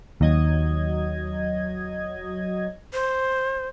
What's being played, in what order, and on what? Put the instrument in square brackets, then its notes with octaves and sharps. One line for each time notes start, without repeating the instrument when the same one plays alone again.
[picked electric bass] D#2 [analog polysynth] F#3 D#5 G#6
[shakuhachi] C5